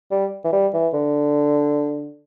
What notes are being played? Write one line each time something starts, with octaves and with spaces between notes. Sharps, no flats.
G3
E3
G3
E3
D3